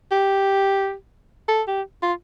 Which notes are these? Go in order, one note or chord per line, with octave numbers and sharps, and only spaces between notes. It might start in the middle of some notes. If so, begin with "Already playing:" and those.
G4
A4
G4
F4